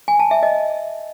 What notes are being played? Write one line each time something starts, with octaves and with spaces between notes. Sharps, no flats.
G#5
A5
E5
D#5